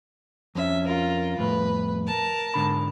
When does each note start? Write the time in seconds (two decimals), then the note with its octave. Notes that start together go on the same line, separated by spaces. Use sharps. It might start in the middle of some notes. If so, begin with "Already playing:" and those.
0.55 F2 C#4 E5
0.86 F4 A#4
1.39 F2 A2 B4
2.07 A#4 A5
2.54 G#2 D3 B5